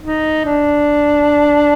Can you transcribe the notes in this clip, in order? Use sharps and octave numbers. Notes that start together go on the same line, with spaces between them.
D#4
D4